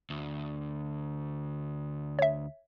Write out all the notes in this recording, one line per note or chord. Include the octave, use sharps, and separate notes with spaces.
D2
C#5 E5